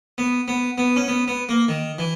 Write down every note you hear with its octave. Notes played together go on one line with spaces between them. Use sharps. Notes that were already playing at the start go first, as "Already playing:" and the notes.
B3
B3
B3
C#4
B3
B3
A#3
D#3
E3